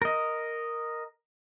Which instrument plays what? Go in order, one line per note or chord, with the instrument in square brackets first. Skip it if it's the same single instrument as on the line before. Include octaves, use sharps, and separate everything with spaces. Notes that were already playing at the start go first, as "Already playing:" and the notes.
[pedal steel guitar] A#4 D#5